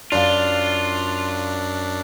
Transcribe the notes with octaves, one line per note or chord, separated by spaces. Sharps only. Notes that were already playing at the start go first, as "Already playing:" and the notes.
F#2 D4 F4 D5 F5